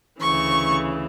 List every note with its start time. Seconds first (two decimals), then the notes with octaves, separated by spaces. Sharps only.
0.20 D2 C#3 E3 C#6